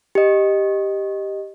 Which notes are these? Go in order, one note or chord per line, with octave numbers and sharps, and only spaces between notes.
G4 D#5